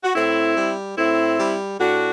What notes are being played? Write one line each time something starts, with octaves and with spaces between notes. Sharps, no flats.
F#4
A2 C4 E4
G3
A2 C4 E4
G3
A2 D4 F#4